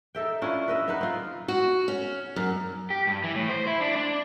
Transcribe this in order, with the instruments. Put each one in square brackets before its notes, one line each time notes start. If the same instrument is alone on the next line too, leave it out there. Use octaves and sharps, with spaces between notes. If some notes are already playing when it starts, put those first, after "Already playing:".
[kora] D#4 A4 E5 G5
C#4 D4 E4 F4
B4 D#5 E5
B3 D#4 B4
C4 F4
[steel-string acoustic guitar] F#4
C#4
F#2
[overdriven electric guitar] G4
G2
E3
A2
C5
E4
D4
D4